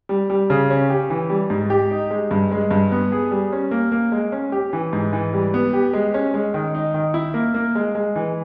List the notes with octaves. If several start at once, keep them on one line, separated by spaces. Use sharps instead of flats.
G3
G3
C#3
C#4
G4
E3
G3
G#2
G4
D#4
G#3
G2
G#3
G2
B3
G#4
G3
C#4
A#3
A#3
G#3
C#4
G4
E3
G#2
E3
G3
B3
G4
G#3
C#4
G#3
D#3
D#4
D#3
E4
A#3
A#3
G#3
G#3
E3